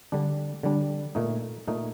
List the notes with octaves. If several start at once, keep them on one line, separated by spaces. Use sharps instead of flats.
D3 G3 D4
D3 G3 D4
A#2 A3 D#4
A#2 A3 D#4